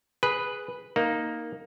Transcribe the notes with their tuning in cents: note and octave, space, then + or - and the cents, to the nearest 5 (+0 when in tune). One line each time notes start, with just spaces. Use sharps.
G#4 +0 B4 +0
A#3 +0 D#4 +0